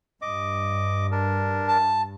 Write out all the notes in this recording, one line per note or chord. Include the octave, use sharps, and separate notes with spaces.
G2 D#5 D6
D4 A#4
A5